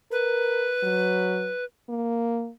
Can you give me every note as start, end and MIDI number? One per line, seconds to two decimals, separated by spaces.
0.11 0.72 70
0.11 1.64 71
0.83 1.51 54
1.89 2.50 58